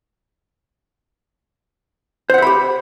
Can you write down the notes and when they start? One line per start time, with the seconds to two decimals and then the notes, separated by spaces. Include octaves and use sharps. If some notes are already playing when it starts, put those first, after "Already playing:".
2.30 C5
2.34 F#5
2.38 E5
2.42 B5
2.47 G4